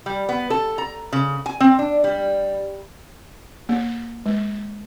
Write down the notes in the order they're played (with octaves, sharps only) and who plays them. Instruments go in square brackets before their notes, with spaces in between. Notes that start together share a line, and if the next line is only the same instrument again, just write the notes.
[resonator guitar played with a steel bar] G3
B3
A4
A#5
C#3
G#5
C4
D4
G3
[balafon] A#3
G#3